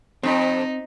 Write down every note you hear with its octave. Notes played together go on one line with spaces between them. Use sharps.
F2 C4 D#4